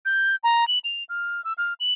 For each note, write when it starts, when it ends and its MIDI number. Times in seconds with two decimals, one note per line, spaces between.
0.05 0.36 91
0.44 0.67 82
0.68 0.79 102
0.84 1.03 101
1.09 1.44 89
1.44 1.53 88
1.58 1.73 89
1.80 1.93 102